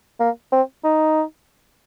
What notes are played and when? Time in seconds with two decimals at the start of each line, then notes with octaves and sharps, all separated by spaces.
0.20 A#3
0.52 C4
0.84 D#4